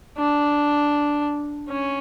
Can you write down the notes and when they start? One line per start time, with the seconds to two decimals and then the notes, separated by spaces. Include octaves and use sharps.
0.18 D4
1.69 C#4